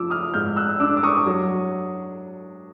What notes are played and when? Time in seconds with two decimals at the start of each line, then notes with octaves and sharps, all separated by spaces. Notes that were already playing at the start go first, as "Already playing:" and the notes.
Already playing: F3 D6 E6
0.10 D#6 F6
0.34 G#2 F6 G6
0.56 E6 F#6
0.80 D4 D6 E6
0.97 D6
1.03 C#6 D#6
1.26 F#3